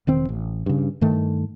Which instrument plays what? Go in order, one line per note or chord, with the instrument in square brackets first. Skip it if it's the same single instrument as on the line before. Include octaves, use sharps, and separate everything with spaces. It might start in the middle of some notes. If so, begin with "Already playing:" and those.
[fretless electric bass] E1 D#3 C4
A1
G2 C#3
G2 D#3 A3